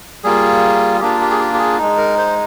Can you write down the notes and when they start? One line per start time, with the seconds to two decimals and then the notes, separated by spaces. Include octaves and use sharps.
0.24 G3 A#3 F4 G#4
1.00 A#3 D4 F4 G4
1.21 G4
1.31 G#4
1.40 G4
1.54 G4
1.59 G#4
1.78 G#3 D#4
1.97 A#4
2.18 C5